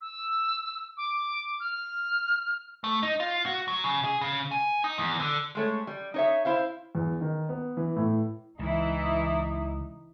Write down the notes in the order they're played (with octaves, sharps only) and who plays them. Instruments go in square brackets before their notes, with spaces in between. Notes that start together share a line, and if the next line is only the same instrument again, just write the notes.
[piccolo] E6
D6
F6
[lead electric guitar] A3
D#4
F4
F#4
F#3
C#3
G#4
C#3
G#5
D#4
E2
D3
[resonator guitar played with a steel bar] G#3 A3 C#5
G3
D#4 C#5 E5
E4 C5 F5
[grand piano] E2
D#3
B3
E3
A2
[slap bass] C#2 [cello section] E3 E4 [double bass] D#4